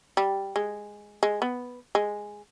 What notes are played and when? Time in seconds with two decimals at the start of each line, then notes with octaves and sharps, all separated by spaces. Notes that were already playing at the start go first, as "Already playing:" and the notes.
0.17 G3
0.56 G#3
1.23 G#3
1.42 B3
1.95 G#3